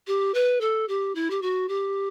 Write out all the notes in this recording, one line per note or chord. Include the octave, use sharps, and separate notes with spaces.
G4
B4
A4
G4
E4
G4
F#4
G4